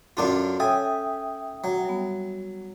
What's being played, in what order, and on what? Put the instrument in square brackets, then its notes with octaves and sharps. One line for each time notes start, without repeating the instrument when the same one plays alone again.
[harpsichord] F#2 D4 F4 [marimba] C#4 A4 F#5
[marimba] A4 C#5 [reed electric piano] E5 G5 D#6 [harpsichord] G#5
[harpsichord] F#3
[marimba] G3 B3